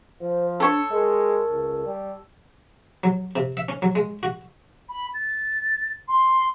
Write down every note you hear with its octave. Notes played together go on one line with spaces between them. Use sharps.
F3 C5
D4 A4 C#5
G#3 A#4
C#2
G3
F#3
C3
E5
C#4
F#3
G#3
F#4
B5
A6
C6